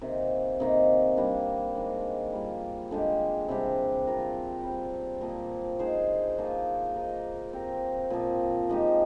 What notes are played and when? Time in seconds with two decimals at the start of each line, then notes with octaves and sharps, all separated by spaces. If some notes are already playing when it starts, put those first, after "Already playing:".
0.01 C3 D#3 A#3
0.60 C3 D#3 A#3
1.17 G3 A#3 D4
1.75 D#3 G#3 C4
2.33 G3 A#3 F4
2.91 D3 G#3 D4 G4
3.49 C3 G3 D4 G4
4.07 C4 F4 A#4
4.64 G3 C4 G4
5.21 A#2 F3 A#3
5.79 G#3 D#4 G#4 C5
6.38 F3 A#3 F4 G#4
6.95 A#3 D#4 A#4 D#5
7.53 C4 G4 A#4
8.10 A#2 F3 C4
8.69 F3 G#3 D#4 G4